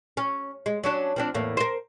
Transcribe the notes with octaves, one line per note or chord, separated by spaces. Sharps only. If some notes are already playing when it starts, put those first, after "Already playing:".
C#4
G#3
F#3 C#4 D4
F3 C4 D4
E2 A2 A#3
A#4 C5